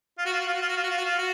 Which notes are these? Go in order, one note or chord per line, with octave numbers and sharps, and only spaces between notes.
F4
F#4
F4
F#4
F4
F#4
F4
F#4
F4
F#4
F4
F#4
F4
F#4